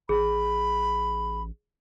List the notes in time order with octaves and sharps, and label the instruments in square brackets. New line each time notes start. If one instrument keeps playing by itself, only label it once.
[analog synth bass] A1 [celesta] G#4 [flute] B5